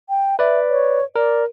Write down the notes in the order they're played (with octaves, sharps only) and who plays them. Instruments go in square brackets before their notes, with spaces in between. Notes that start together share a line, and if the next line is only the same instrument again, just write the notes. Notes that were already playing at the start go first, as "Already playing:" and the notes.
[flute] G5
[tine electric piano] B4 D5 [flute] E5
[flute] C#5
[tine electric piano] A#4 [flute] D5